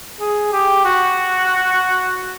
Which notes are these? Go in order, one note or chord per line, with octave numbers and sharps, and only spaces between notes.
G#4
G4
F#4